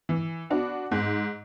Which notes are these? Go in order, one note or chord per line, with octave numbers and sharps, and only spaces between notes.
E3
B3 D4 F#4
G#2